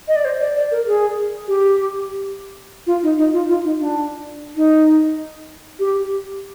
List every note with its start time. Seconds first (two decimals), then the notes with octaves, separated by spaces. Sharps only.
0.08 D#5
0.16 D5
0.25 C5
0.40 D5
0.56 D5
0.72 A#4
0.86 G#4
1.48 G4
2.87 F4
3.03 D#4
3.18 D#4
3.33 F4
3.49 F4
3.64 D#4
3.80 D4
4.56 D#4
5.79 G4